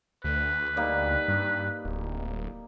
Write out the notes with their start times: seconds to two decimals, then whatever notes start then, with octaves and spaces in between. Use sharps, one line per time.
0.24 D2 B4
0.77 G3 A#3 D#4
1.28 G2
1.85 D1